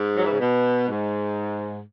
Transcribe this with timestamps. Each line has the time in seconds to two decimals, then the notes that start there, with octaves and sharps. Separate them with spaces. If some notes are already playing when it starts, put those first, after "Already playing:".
Already playing: G#2
0.17 F#3
0.25 E3
0.32 C#3
0.40 B2
0.88 G#2